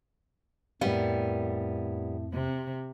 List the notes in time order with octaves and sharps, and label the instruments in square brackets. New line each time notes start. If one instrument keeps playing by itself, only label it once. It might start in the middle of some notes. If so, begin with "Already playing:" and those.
[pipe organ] F2 [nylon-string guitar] A2 A#4 F5 [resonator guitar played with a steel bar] G3 B3
[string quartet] C3